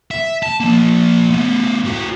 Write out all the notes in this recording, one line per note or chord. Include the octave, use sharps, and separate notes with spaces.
E5
A5
F3 A#3
A3 B3
A2 F#4